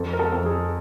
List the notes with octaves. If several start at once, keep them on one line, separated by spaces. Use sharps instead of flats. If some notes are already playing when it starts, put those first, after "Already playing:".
Already playing: F2 A4
A#4
A4
F2
G#4